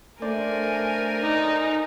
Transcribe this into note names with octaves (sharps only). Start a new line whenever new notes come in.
A3 D4 A#4 C5 D5 G#5
D#4